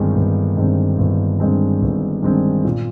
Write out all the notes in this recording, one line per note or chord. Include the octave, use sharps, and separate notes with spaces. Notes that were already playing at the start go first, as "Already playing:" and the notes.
Already playing: G1 G2 D#3 G#3 C4
G1
G2 D#3 G#3 C4
G1
G2 D#3 G#3 C4
G1
G2 D#3 G#3 C4
A#2